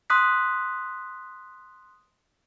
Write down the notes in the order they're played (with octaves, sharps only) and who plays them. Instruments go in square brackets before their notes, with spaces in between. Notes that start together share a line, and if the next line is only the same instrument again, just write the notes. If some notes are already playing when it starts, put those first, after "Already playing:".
[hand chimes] C6 D#6 F#6 B6